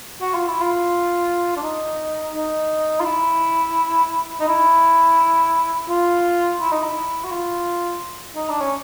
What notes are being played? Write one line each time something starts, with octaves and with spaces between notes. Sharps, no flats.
F#4
F4
E4
F4
D4
D#4
D#4
F4
E4
D#4
E4
F4
E4
D#4
E4
F#4
F4
D#4
D4
C#4